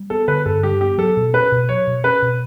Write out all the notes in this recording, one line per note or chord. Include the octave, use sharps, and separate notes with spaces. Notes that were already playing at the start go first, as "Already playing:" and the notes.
Already playing: G3
B3 A4
D3 B4
G2 A4
G3 G4
B3 G4
F#3 A4
B2
C#4 B4
B2
F#3 C#5
B2
C#4 B4
B2